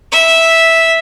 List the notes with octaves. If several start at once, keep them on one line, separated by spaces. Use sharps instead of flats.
E5